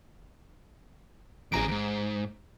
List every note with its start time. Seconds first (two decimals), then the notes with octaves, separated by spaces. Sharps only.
1.52 A1 F2 G#4 A#5 D7
1.68 D#2 G#2